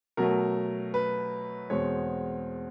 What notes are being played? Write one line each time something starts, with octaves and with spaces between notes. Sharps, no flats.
B2 F#3 A3 A#4
B4
E2 B2 G#3 C4 C#5